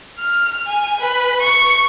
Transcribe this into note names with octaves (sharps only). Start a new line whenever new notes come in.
F6
G#5
B4
C#6